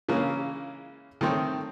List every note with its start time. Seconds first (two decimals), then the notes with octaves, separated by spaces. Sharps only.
0.09 C#3 E3 G#3 A#3 C#4
1.21 D#3 A3 C4 C#5